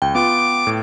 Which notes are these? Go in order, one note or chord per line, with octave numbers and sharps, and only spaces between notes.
C#2 G5
B3 F4 D6
A2